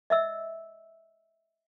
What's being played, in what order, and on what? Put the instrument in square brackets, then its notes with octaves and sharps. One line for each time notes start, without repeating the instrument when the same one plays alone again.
[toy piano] D#5 E5 E6